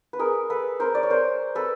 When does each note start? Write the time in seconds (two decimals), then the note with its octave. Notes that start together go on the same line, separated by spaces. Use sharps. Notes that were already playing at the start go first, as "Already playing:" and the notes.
0.13 B4
0.19 G#4 A#4
0.50 A4 B4
0.80 A#4 C5
0.95 D5
1.03 C#5
1.10 A#4 C5
1.55 A4 B4